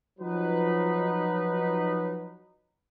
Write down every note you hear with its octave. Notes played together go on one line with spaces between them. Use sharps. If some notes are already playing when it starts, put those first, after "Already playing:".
F3 F#3 D#4 B4